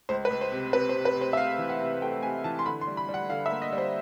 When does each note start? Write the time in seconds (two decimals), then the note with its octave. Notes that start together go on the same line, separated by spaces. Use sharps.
0.09 C#2 C5
0.25 B4
0.30 C#2
0.41 C5
0.52 C3
0.73 C3 B4
0.89 C5
0.95 C3
1.05 B4
1.16 C3
1.21 C5
1.33 E5
1.37 C3 F5
1.58 E3
1.69 F#5
1.80 C3
2.02 A3 G5
2.23 C3 G#5
2.44 E3 A5
2.59 C6
2.66 D3 B5
2.81 C6
2.87 G3
2.97 B5
3.09 G3
3.14 F#5
3.30 D3 F5
3.46 E5
3.51 A#3
3.62 D#5
3.73 G3
3.78 C5